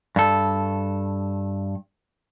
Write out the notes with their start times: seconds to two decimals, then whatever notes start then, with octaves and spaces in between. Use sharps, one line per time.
0.16 G2 A4